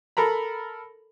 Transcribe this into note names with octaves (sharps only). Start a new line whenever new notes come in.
A4 A#4 A#5 B5